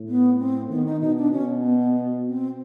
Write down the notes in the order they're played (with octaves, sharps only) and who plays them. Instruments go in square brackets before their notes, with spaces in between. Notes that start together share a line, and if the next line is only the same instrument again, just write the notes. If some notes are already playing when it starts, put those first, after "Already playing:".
Already playing: [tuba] A2
[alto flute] B3
C4
[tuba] D#3 [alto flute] B3
[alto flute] D#4
[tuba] B2 [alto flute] D#4
[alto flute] D4
[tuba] B2 [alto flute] C#4
[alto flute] B3
B3
B3
C4